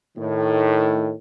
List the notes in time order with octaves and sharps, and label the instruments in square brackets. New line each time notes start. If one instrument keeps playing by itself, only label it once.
[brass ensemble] A2 D#3